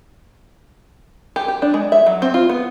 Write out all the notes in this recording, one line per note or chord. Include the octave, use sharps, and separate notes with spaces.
G4
G4
D4
G#3
E5
F#3
C4
F4
B3